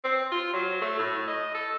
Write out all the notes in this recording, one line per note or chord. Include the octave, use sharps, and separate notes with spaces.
C4
F4
F#3
A3
A2
D#5
A4